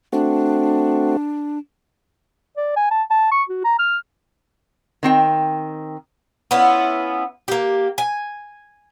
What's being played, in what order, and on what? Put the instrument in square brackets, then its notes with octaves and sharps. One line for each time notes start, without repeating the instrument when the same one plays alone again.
[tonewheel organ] A3 C4 F#4 [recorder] D4
[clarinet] D5
G#5
A5
A5
C#6
F#4
A#5
F6
[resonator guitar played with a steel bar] D#3 C4 G5
[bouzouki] B3 C#4 E4 F4
A#3 G4
G#5